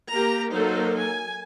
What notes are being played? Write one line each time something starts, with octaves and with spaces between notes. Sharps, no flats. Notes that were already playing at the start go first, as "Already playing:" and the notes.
A#3 G4 A#5
F#3 A#3 D#4 A4 A#4 C5
G#5